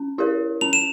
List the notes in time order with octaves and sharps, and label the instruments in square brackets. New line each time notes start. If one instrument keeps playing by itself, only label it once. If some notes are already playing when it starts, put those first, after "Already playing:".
Already playing: [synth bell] C#4
E4 G4 A#4 C#5
[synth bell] C#4 [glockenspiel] F7
[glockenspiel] E7